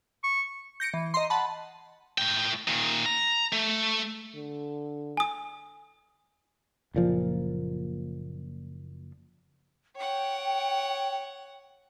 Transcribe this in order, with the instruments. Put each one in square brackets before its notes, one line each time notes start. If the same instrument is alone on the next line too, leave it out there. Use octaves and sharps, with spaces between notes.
[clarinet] C#6
[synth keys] G6 A#6 C#7 D7
E3
D#5 A#5 C6
F#5 A5 B5
[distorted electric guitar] A2 G5
A#2 D#3
A#5
A3
[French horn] D3
[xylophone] G#5 D#6
[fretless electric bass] F#1 A#2 F3
[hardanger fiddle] C#5 F#5 [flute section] G5